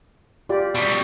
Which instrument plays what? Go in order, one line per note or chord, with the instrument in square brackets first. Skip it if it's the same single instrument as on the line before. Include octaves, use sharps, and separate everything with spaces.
[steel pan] F4 G4 D5
[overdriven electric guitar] B2 G3